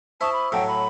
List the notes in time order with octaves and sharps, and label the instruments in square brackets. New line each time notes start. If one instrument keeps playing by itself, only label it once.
[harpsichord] E4 [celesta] C5 C#6 D#6 [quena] A5
[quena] B5
[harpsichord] A2 F#3 [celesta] F#5 A5 E6 [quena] G5
[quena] B5